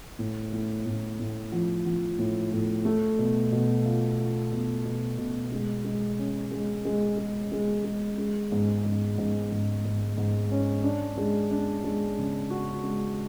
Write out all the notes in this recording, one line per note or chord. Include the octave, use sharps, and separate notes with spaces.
A2
A2
A2
A2
F3
F3
A2
A2
A3
B2
B2
F4
F4
B2
B2
B2
G#3
G#3
C#4
G#3
G#3
G#3
G#3
G#3
G#3
G#2
G#2
G#2
G#2
G#2
G#2
C#4
D4
G#3
D4
G#3
C#3
F#4
G#3